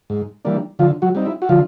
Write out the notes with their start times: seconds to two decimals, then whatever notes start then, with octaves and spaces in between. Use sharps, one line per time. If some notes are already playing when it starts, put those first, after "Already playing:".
0.10 G#2
0.45 E3 G3 A#3 D4
0.79 D3 F3 F4
1.02 F#3 F#4
1.15 G3 C4 D#4
1.25 E4
1.42 F#4
1.49 D3 F3 F4